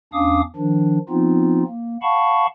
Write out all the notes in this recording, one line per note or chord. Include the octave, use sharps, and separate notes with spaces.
E2 C#4 D4 F5 D6 D#6
D#3 F3 D4
F3 B3 C4 D#4 F4
A#3
F5 F#5 A5 B5 C#6